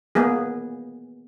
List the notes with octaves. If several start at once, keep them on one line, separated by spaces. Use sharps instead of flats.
A#3 B3 G#4